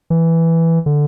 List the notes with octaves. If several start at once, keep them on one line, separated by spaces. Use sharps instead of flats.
E3
D3